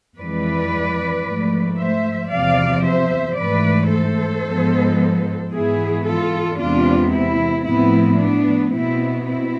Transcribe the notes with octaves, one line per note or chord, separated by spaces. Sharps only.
F2 E3 G#3 B4 D5
G#2 F3 A3
C5 E5
E2 C3 F3 D5 F5
C5 E5
G#2 E3 A3 B4 D5
A4 C5
G#2 F3 G#3 B3
G#2 E3 B3 E4 G#4
F4 A4
E2 C3 G#3 B3 D4 F4
C4 E4
A2 F3 B3 C4 E4
B3 D4
B2 B3 C4 E4
C4 E4